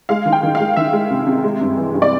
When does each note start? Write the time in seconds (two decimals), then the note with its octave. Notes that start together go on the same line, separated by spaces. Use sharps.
0.09 G#3 F5
0.26 D#3
0.32 G5
0.43 D#3
0.55 F5
0.60 G#3
0.76 D#3 E5
0.93 G#3
1.11 C3
1.27 C3
1.44 G#3
1.61 G2
1.77 E3
1.94 G2
2.02 D5